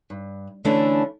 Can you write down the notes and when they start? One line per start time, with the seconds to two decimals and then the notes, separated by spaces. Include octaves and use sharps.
0.10 G2
0.65 D3 E3 A3 C#4 D4 E4